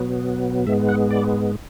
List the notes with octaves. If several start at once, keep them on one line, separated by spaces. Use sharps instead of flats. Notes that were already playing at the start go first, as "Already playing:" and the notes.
Already playing: B2 F#3 B3
G#2 G#3 B3 E5
F#5
D5